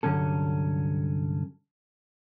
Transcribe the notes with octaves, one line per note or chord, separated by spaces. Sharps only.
C2 G2 D3 F#3 C#4 A4